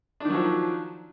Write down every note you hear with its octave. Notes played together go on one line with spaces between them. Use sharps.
D#3 F3 F#3 D4